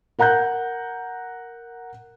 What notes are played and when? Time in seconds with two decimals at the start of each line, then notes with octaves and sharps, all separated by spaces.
0.19 A#4 F#5 A#5 F#6 G6